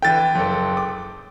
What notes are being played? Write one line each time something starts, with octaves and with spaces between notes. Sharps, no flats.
D3 E3 G5 A6
F#1 A4
D6